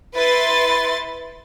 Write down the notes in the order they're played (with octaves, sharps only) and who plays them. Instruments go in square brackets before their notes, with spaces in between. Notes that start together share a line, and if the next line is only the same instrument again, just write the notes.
[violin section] E4 B4 C6 A6